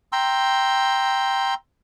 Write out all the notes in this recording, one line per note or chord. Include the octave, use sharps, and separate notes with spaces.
G5 A#5 C6 E6